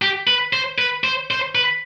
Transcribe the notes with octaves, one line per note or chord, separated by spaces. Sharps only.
G4
B4
C5
B4
C5
C5
B4